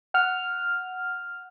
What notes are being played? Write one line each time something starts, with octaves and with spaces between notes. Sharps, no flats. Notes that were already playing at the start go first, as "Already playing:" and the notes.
F#5 F6